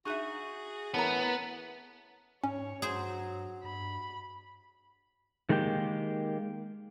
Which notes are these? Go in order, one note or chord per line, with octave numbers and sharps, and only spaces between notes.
D#4 F#4 G#4 E5 C#6 F#6 D#7
A2 E3 B3 C#4 A#4 C#5 A5 A#5
G#2 C#4 C#5
G2 F#3 G#4 C5
G2 B5
D#3 G#3 A#3 D4 G4